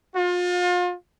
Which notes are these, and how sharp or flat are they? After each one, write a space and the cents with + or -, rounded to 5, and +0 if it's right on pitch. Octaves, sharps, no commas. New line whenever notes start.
F4 +35